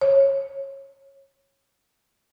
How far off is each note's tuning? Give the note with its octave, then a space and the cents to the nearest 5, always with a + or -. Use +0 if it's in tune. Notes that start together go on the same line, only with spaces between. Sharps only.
C#5 -20